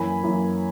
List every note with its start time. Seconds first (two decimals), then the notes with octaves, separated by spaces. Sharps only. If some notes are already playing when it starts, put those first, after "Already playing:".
Already playing: F#2 E3 A#3 G#5 B5
0.23 F#2 E3 A#3